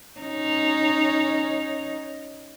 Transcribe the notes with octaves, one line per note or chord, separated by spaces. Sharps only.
C#4 D#4